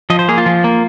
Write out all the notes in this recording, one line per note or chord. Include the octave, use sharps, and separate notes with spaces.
F3 D#5
C5
A#3 G#4
F4
F3
A#3